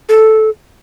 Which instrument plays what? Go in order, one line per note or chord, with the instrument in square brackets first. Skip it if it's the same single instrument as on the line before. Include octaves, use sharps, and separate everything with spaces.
[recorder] A4